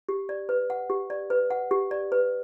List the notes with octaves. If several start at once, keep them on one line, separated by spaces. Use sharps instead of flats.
G4
D5
B4
F#5
G4
D5
B4
F#5
G4
D5
B4